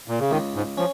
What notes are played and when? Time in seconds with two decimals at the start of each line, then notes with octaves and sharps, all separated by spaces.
0.08 A#2
0.20 C#3
0.31 C#2 D#3
0.55 G#2
0.77 F3 C#4